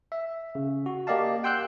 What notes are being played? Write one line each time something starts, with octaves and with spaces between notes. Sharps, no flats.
E5
C#3
F#4
A#3 G4 D5 D#5 F5 A5
F#5 G5 C6 E6 F#6 G6